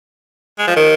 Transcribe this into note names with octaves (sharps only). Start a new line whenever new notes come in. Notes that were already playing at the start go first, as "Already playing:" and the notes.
G#3
F3
D#3